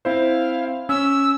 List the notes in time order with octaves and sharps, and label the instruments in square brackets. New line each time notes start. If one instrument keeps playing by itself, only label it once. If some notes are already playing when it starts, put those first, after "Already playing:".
[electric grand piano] C4 E4 C5 [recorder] F5
[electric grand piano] C#4 [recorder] E6